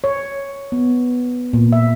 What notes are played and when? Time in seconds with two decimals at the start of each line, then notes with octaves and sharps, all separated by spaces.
0.04 C#5
0.72 B3
1.53 A#2
1.73 E5